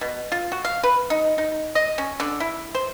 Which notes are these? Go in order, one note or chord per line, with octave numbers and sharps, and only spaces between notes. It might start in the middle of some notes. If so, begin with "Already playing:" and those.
B2
F4
F#4
F5
B4
D#4
D#4
D#5
C#4
D3
E4
C5